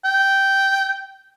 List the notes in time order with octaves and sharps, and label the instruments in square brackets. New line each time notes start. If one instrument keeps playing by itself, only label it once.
[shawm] G5